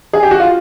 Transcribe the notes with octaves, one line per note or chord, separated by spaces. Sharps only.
G#4
G4
F#4
F4